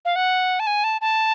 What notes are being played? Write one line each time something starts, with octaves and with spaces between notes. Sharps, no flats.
F5
F#5
A5
G#5
A5
A5